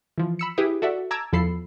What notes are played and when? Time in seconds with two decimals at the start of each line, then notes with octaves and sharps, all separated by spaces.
0.18 E3 F3
0.39 B5 E6 C#7
0.58 E4 G4 G#4 B4 D6 D#6
0.82 F#4 A4 D5 E5 F#5
1.11 A5 A#5 D6 E6 G#6
1.33 E2 F3 A4 B5 C7